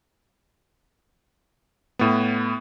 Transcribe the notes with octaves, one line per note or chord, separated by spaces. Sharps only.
A2 B3